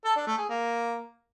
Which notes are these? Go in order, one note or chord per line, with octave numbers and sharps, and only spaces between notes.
A4
D4
A3
G#4
A#3